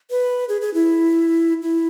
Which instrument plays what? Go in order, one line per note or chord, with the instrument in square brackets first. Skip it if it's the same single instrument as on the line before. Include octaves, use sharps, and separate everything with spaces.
[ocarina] B4
G#4
G#4
E4
E4